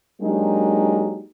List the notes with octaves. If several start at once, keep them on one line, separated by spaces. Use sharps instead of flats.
F#3 G#3 A#3 D4 D#4 G4